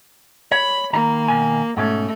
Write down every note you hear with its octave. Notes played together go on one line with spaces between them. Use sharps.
C#5 B5
D#3 A#3 A#5
B2 D#3 G#5
G#2 B2 A3 C#4